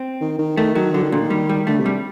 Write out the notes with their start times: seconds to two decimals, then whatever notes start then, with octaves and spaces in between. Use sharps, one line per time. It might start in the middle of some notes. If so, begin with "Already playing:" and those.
Already playing: C4
0.21 D#3
0.39 D#3
0.57 D#3 A3
0.75 D#3 F#3
0.94 D3 F#3
1.03 D#3
1.12 A#2 D3
1.20 D#3
1.30 G3
1.49 G3
1.67 D3 A3
1.80 C3
1.86 G3